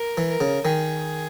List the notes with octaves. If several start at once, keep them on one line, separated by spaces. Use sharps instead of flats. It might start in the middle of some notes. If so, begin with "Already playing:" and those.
Already playing: A#4
E3
A#4
C#3
D#3 G#4